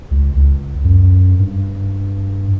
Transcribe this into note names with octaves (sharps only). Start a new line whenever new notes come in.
C#2
C#2
F#2
G2